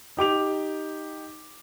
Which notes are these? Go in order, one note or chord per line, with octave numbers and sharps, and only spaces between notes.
D#4 G4 D6 F7